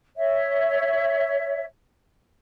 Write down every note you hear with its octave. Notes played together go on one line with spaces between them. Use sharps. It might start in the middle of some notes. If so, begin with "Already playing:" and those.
C#5 E5